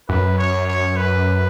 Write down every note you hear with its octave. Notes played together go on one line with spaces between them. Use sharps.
F#2 B4
C#5
C#5
B4